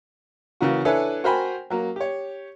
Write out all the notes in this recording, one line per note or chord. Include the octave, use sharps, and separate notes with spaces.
C#3 E3 A#3 F#4
D4 E4 A4 B4 C#5 G#5
F#4 A#4 C5 G5 G#5 B5
F#3 A#3
G4 C#5